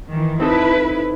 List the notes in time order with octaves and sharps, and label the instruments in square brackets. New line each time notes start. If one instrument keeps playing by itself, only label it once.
[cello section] D#3 E3
[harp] C4 D#4 A4 [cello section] E4 B4